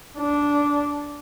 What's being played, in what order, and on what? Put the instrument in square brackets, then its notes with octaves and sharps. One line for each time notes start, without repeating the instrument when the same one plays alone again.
[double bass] D4